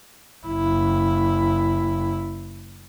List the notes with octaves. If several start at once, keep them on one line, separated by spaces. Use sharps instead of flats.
F#1 E4